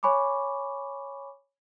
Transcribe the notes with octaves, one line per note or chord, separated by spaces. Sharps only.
C#5 G#5 B5 C#6 D6